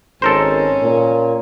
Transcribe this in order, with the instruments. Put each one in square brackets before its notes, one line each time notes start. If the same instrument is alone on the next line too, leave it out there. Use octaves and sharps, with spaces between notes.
[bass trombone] G#1 [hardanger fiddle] C#4 [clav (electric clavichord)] A4 A#4 C5
[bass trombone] A#2